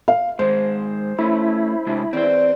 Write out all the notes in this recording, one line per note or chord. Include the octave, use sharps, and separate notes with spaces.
F5
G#2 D#3 G#3 C5
A3 C#4 E4
C3 G#3 D4
E2 C4 C5